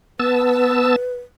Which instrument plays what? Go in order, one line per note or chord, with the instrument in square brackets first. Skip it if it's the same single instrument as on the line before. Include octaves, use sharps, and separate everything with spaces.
[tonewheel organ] B3 A5 E6 [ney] B4